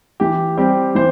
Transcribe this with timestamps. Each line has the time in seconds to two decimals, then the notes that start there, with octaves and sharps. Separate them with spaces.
0.20 E3 G4
0.57 G3 C4 G4
0.95 E3 C5